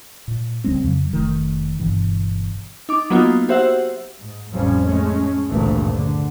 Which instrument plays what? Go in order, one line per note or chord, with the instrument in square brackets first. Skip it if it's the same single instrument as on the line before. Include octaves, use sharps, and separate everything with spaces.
[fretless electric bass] A#2
C#2 G3 G#3 C4
F2 C#3 F#3
F1 D#3 A3
G1 G2 B2 E3
[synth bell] D#4 D6
F#3 A#3 B3 D#4 F4 F#4
F#4 G4 C5 E5 F#5 E6
[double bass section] G#2
A1 F2 F3 G3 C#4
G#3 A3 C#4
G#1 D2 G2 A#2 E3 A3
D3